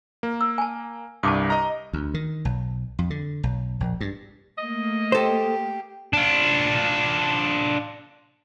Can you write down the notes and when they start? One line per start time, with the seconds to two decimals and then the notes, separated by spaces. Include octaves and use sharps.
0.23 A#3
0.41 E6
0.58 G#5 A5
1.23 C2 G2 A5 D6 D#6
1.50 D#5 A#5
1.93 D2
2.14 D#3
2.45 B1
2.99 F2
3.10 D3
3.43 B1
3.80 A#1
4.01 G2
4.58 A3 A#3 D#5
5.12 G4 A4 C5
6.13 D4 F4